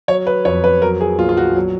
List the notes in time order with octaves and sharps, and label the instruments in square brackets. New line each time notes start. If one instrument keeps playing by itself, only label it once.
[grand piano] F#3 C#5
B4
F2 C#5
B4
F#3 A#4
G#4
A#1 F4
F4
F#4
F#3